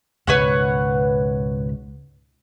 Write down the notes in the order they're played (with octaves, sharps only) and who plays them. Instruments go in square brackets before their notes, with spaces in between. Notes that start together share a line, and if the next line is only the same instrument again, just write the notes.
[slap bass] C#2 G#2 B2 [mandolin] B4 C#5 F#5